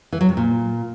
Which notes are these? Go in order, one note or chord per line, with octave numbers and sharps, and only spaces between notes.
E3
F#3
C3
A#2